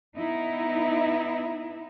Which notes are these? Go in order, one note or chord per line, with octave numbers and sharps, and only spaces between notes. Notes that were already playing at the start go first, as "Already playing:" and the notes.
B3 D#4 E4